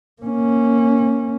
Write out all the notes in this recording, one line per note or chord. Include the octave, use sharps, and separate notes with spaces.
A#3 C#4